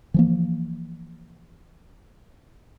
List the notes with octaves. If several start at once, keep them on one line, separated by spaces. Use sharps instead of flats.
E3 F3 A#3